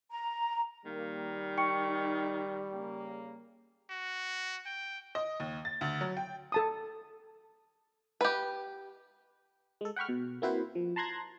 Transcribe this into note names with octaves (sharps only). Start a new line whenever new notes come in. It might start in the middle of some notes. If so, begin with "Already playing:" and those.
A#5
D#3 G3 A#3
D#4 G5 C#6 C#7
C#3 A#3
F#4
G5
D#5
D#2
A6
D2
F#3
G5
A4 A5 D#6
G4 B4
G#3 A4
F#5 G5 B5 C#6 F6
B2
A#3 C4 E4 F#4 B4 C5
F3
A5 A#5 C6 F#6 G#6 A#6